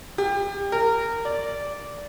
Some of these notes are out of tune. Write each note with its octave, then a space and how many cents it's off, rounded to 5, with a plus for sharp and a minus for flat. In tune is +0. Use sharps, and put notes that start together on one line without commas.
G4 +30
A#4 -20
D5 -10